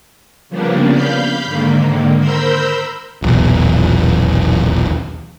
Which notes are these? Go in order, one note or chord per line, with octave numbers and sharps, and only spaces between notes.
C#3 F3 G3 A#3 B3 D4
F5 B5 G6
G#2 D3 D#3 A#3
A#4 C5 B5 E6 G6
D#1 B1 E2